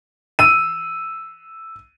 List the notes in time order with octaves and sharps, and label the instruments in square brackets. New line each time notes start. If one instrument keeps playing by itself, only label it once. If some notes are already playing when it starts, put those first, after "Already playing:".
[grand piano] E6 D#7